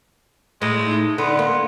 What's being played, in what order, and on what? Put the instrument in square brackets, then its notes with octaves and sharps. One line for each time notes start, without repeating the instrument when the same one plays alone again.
[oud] A2 [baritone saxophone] G#3
[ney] D#4
[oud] D3 [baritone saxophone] B3 [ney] C6
[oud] A#3